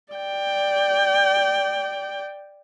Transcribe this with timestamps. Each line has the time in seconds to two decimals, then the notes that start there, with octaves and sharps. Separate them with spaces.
0.13 D5 G5